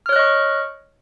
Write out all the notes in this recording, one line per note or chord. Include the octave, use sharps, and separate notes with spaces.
C#5 D#5 C#6 F6 F#6